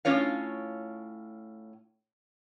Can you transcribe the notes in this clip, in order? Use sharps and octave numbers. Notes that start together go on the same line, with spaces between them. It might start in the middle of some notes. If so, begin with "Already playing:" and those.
A2 C#4 F4 C#5 F5